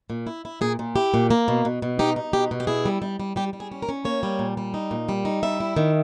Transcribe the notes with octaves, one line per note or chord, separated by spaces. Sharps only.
A#2
E4
E4
A#2 G#4
A#2
E4 G4
A#2
A#3
B2
B2
B2
D#4 G4
D#4
B2 G4
B2
G4
E4 G#4
G3
G3
G3
G3 G4
G3
G#4
C#4
A#4
C#4
A#3 C#5
G3
A#2
G3
D#4
A#2
G3
D#4
G3 E5
E4
D#3